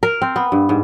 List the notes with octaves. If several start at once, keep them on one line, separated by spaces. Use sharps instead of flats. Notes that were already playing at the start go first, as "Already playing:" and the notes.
A#4
C4
B3
G2
G#2